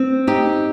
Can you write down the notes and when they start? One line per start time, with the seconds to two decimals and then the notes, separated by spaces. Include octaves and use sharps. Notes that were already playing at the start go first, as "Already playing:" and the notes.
Already playing: C4
0.27 D#4 G4